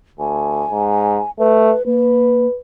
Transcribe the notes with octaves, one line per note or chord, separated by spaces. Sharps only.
D2 G#5
G#2
A3 B4
A#3 B4